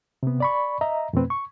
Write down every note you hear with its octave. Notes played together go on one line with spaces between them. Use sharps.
C3 B3
D5 B5 C#6
D#5 E5 A#5
F2 B2 A3 C4 B4
C#6